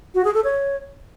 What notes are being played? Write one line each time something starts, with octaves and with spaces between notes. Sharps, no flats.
F#4
G#4
A4
C#5